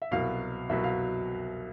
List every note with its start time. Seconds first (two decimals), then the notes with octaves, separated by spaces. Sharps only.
0.02 E5
0.11 C2 B2 F#3 F5
0.69 C2 B2 F#3 E5
0.84 F5